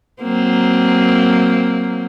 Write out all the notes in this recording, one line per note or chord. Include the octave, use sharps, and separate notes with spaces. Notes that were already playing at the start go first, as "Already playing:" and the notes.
F#3 A#3 C4